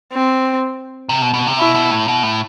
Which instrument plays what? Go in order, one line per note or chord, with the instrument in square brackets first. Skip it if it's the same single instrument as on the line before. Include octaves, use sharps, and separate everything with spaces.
[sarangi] C4
[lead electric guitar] C3
B2
B2
C3
[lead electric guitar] B2 [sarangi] E4
[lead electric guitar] B2
A2
B2
A2